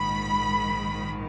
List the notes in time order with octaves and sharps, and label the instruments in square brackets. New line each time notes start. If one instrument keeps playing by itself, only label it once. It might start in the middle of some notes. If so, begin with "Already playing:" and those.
Already playing: [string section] A#1 G#2 D#3 B5